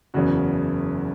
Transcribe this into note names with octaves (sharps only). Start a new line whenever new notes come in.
F#1 E2 C#3 F#4